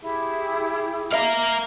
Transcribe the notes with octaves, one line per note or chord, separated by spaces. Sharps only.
E4 G4 G#4
A#4 E5 F5